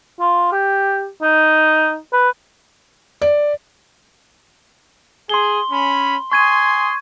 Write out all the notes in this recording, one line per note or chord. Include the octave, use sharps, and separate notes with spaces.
F4
G4
D#4
B4
D5
G#4 C6 G7
C#4 B5
G#5 C6 C#6 D#6 G#6 D#7